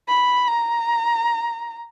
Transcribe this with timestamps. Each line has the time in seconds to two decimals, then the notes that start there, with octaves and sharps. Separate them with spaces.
0.08 B5
0.48 A#5